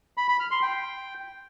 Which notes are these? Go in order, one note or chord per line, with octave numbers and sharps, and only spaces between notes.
B5
B5
F6
C6
G5